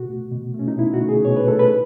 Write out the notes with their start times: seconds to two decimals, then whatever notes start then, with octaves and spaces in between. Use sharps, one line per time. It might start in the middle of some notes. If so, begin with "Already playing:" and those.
Already playing: B2 F#4
0.08 A3
0.32 B2
0.54 A3 C#4
0.68 D#4
0.78 B2 E4
0.94 F#4
1.01 A3
1.09 G#4
1.25 B2 C#5
1.36 B4
1.47 A3 A4
1.59 B4